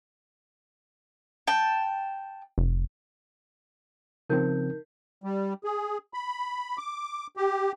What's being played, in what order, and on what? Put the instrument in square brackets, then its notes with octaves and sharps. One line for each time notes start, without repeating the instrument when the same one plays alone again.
[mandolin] G5 A5
[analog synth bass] F1
[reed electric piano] C#3 F3 C4 [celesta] D#4 A#4 G6
[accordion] G3
G#4
B5
D6
G4